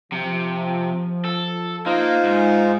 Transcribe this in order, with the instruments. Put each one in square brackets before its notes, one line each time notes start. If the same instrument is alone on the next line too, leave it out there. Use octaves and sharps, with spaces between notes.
[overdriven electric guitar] C3 [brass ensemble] F3
[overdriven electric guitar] A4
[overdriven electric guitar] A#3 [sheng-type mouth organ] D#4 F4 C5
[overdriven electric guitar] G#2